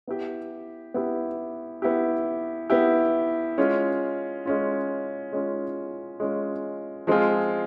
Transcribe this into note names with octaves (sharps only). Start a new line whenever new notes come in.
B3 E4 G4
B3 E4 G4
B3 E4 G4
B3 E4 G4
G#3 C#4 F4
G#3 C#4 F4
G#3 C#4 F4
G#3 C#4 F4
F3 G#3 C4 F4 G#4